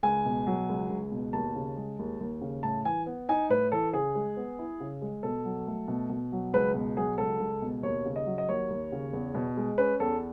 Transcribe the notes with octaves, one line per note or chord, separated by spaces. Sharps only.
C#2 G#5
B2
F#3
C#2
C#2
B2
D#2 A5
C#3
G#3
D#2
D#2
C#3
A2 A5
E3 G#5
B3
D#4 G#5
A2 B4
E3 A4
C#3 G#4
G#3
B3
E4
C#3
G#3
B2 A4
F#3
A3
B2
B2
F#3
C#2 B4
B2
F#3 G#4
C#2 A4
C#2
B2
D#2 C#5
C#3
D#5
F#3
D#5
D#2 C#5
D#2
C#3
E2
B2
G#3
C#4 B4
E2 A4